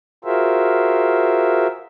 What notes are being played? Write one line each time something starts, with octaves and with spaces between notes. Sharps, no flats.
F4 F#4 G#4 A#4 C5 E5